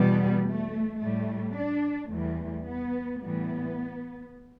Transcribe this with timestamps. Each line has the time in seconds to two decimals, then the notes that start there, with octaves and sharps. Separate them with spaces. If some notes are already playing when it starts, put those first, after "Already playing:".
Already playing: E2 B2 G3 B3
0.46 A3
1.00 A2 G3 A3
1.56 D4
2.10 E2 E3 G3 A3
2.65 B3
3.21 A2 E3 G3 B3